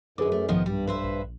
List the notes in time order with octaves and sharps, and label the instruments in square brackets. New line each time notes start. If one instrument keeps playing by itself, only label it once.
[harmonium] F#2 [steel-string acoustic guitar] D3 D#4 [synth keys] G#4 B4 D6
[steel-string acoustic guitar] A3
[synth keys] B1 G#2 [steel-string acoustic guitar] D#3 F3 B3
[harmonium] G2 [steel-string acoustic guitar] G3
[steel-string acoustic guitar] B4 C5 E5
[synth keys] A#1